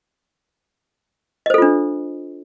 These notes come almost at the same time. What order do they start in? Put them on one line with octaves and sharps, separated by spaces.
D#5 C5 A4 F4 D4